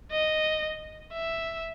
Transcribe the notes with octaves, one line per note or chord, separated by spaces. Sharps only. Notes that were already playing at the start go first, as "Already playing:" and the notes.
D#5
E5